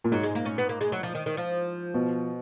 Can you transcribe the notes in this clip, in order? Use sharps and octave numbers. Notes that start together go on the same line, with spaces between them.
A#2
G#2 F#3
G#3
A#3
C#4
B3
A#3
G#3
F#3
F3
D#3
D#3
F3
B2